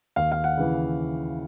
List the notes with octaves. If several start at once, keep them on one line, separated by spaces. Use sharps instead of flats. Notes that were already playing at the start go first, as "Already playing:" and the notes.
D#2 F5
F5
F#5
C#3 E3